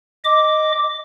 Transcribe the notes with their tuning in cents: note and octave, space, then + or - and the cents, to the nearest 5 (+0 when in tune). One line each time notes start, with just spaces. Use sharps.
D#5 +0 D6 +0